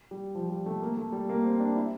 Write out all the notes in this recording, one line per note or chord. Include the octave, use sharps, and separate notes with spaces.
G3
F3
G3
A3
A#3
A3
G3
A#3
C4
D4
E4